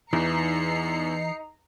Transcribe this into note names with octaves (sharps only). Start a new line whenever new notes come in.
E2 E3 D#4 A#5 C7 C#7